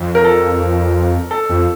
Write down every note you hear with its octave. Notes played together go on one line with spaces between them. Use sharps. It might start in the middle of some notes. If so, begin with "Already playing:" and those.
Already playing: F2
A#4
A4
A4
F2